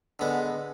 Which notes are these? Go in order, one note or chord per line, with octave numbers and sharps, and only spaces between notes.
D3 G#3 B3